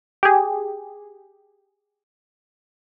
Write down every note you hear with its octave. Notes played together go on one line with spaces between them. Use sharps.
G4 G#4